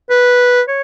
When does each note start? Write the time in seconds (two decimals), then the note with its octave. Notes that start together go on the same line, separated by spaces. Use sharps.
0.10 B4
0.68 C#5